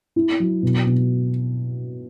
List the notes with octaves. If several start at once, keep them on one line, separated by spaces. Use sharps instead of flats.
E4
F#3
B2
B2